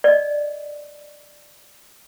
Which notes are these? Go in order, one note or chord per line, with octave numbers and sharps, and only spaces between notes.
D5 D#5